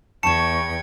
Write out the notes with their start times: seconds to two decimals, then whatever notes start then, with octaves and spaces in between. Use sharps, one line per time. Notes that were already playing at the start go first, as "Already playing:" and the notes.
0.23 E2 G5 A5 C#6 G#6 C#7 E7